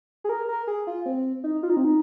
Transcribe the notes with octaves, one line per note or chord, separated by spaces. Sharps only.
G#4
A#4
A#4
G#4
F4
C4
D#4
F4
D#4
C4
D#4